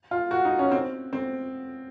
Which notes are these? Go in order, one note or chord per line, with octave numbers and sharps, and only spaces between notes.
F4
F#4
D#4
C#4
C4
C4